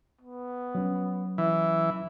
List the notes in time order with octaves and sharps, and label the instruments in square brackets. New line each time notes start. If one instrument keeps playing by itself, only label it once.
[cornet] B3
[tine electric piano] F#3 C#4
[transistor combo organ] E3 [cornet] E5